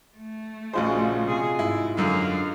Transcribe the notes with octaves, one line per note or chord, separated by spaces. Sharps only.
A3
A#1 C#3 G#3 F4 F#4 C5
C3 G#4
G#2 E4
F#2 D3 F5